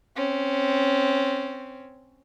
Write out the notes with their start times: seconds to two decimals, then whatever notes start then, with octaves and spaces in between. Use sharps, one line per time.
0.16 C4 C#4